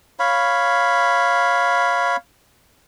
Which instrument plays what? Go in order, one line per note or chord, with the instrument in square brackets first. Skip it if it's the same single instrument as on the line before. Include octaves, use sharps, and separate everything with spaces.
[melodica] C#5 F5 B5